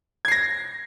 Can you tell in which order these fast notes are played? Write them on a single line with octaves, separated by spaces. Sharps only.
G#6 C7 A#6